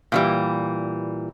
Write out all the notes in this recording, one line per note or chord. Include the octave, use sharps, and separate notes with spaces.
A#2 E3 G3